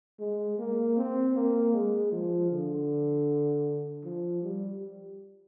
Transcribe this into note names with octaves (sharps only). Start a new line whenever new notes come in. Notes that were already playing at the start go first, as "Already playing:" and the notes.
G#3
A#3
C4
A#3
G#3
F3
D3
F3
G3